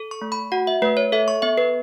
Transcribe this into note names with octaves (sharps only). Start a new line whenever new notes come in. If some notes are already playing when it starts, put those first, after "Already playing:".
Already playing: A4
C#6
A3
B5
F#4 F#5
E5
A3 B4
C#5
A4 E5
C#6
B3 E5
B4